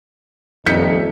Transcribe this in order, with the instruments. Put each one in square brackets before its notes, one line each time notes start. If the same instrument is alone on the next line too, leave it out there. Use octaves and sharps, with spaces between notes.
[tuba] D#1 [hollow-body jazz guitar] F2 [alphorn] D#4 [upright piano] G6 B6 C#7